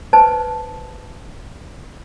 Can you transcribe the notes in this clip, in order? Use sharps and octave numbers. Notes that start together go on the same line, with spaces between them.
B4 C5 A5